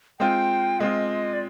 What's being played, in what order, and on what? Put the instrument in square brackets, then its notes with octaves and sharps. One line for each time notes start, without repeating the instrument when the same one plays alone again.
[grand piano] G#3 C4 F4 [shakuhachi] G5
[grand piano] G#3 C4 F4 [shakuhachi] D#5
[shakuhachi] D5